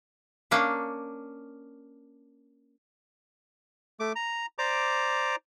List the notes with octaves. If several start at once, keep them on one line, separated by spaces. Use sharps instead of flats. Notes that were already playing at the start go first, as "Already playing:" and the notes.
A#3 C#4 D4
A3 D6
A#5
C5 D5 A#5 D6